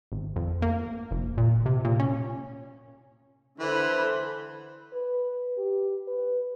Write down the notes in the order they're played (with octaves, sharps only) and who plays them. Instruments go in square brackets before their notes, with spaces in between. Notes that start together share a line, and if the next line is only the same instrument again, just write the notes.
[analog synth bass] G#1
F2
A#3
F1
A#2
C3
A#2
C#4
[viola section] D3 C5 B5 [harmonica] E3
[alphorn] B4
G4
B4